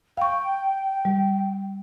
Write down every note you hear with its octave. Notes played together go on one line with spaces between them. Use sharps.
F5 G5 C#6
G3